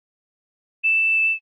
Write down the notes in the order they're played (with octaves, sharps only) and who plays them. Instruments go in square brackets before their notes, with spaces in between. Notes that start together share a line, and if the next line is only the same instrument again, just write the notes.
[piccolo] E7